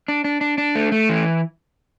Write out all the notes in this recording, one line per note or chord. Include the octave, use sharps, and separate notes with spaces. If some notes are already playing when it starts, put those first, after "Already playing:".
D4
D4
D4
D4
A3
A3
E3